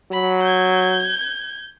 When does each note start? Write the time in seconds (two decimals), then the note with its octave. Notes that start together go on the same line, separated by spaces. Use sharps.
0.12 F#3 B5
0.42 G6 G#6